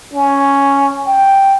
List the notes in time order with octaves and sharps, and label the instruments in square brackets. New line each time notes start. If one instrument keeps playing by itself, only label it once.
[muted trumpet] C#4
G5